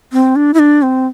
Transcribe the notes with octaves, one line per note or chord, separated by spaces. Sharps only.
C4
D4
E4
D4
C4